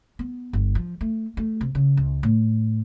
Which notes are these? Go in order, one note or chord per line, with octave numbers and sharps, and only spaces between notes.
B3
G1
F3
A3
A3
C3
C#3
C#2
A2